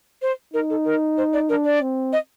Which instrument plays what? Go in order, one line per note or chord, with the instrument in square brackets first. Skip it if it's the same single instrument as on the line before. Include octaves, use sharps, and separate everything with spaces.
[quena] C5
[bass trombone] D#4 [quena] A#4
[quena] A4
A#4
C5
D5
[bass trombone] D4 [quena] A#4
[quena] D5
[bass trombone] C4
[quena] D#5